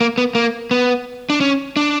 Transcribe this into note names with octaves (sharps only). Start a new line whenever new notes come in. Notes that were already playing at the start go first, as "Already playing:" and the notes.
A#3
B3
A#3
B3
D4
C#4
D4